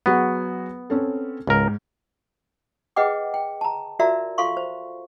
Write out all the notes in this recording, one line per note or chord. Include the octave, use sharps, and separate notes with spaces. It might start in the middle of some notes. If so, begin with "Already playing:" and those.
F#3 B3 F#4 G#4
C4 C#4 A4
C#2 G#2 A#4
G#4 B4 D#5 F#5 G5 D6
G5
A5 A#5
F4 F#4 A#4 D5 E5 A#5
F4 A4 F5 C6 C#6
C5